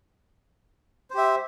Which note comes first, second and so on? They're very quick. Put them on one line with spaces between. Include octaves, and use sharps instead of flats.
C5 G4 E5